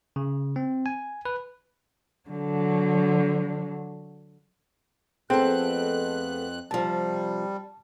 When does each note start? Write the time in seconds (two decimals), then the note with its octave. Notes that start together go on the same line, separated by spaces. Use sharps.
0.16 C#3
0.56 C4
0.86 G#5
1.25 B4
2.30 D3 F#3
5.30 F2 A3 B3 C4 G#4 A4 F#6
6.71 C3 F3 G3 A5